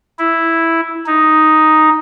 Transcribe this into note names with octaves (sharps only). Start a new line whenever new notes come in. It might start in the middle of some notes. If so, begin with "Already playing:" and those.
E4
D#4